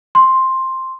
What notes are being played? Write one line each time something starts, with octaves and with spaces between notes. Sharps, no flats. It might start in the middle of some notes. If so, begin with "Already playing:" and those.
C6